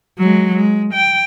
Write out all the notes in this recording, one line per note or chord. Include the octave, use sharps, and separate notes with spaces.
F#3 G#3
G#3
G5